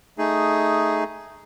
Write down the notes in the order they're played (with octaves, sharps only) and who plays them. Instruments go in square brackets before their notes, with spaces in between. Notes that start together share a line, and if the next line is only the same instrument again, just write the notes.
[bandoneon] A3 D#4 G#4